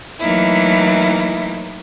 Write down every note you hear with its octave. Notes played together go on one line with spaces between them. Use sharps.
E3 F#3 A3 A#3 D#4 E4